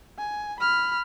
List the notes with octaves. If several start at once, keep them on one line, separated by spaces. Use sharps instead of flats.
G#5
B5 F6